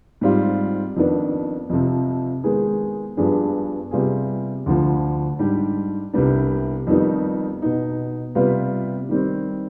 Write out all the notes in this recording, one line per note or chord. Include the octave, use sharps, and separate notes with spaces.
G#2 G3 C4 F4
F2 D#3 B3 D4
F2 C3 F3
D#3 G#3 B3 D#4 G#4
G2 F3 B3 D4 G#4
C3 G3 B3 F4 G#4
D2 D3 F3
G#2 G3 D4 G4
C2 C3 G3 B3 D4
F2 D#3 G3 B3 D#4
B2 B3 D#4
C3 G3 B3 F4 B4
D#3 G3 C4